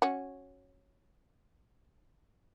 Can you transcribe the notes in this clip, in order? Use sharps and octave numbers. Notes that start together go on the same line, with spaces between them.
C#4 F#4